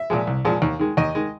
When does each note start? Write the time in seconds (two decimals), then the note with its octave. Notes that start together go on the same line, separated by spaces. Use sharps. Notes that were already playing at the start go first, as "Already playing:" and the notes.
Already playing: E5
0.10 A#2 F3 G#3
0.27 C2
0.45 A#2 F3 G#3
0.62 D#2
0.79 D#3 G#3
0.97 D#2 D#5
1.15 D#3 G#3